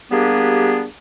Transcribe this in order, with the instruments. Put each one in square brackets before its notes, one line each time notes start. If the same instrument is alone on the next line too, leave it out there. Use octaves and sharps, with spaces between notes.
[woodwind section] G3 A#3 B3 D4 G4 G#4